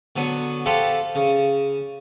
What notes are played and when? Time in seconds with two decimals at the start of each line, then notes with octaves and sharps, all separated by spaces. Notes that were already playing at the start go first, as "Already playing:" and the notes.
0.16 D3 F#3 B3
0.66 G4 A4 B4 C5 F5 F#5
1.15 C#3